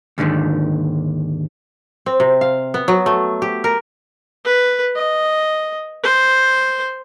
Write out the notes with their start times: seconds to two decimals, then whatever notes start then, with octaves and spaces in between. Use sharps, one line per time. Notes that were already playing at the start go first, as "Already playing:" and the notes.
0.18 D#2 G#2 D3 D#3
2.06 C4
2.20 C3
2.41 F5
2.74 B3
2.88 F#3
3.06 A3
3.42 G4
3.64 A#4
4.45 B4
4.96 D#5
6.04 C5